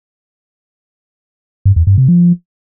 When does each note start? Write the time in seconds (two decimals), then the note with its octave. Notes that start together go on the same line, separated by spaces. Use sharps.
1.65 G2
1.76 E2
1.87 G2
1.98 C3
2.08 F3